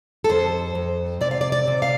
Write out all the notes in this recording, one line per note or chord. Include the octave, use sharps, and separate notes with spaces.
A4
F2 C5
F2
C3 D5
F5
D5
D5
C3
F5